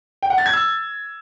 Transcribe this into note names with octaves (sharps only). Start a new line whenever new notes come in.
G5
F#5
A6
G#6
E6